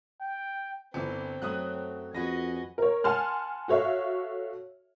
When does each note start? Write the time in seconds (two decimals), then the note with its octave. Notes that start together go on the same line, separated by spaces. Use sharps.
0.21 G5
0.94 G1 E3 C4
1.42 F#2 F#3 A3 D#6 F#6
2.15 F2 F#4 G#4 B4 D#5 G#5 A#6
2.78 A#4 C#5
3.04 F#5 G#5 A5 C6 F6
3.68 F#4 A4 C#5 E5 F5